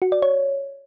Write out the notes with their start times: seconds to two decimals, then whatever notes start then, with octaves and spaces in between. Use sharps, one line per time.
0.02 F#4
0.12 D5
0.22 C#5